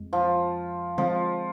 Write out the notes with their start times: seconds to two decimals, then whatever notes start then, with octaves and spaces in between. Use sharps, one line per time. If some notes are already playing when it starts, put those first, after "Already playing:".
Already playing: F2 G#3
0.13 F3
0.98 D3 F3 G#3 C4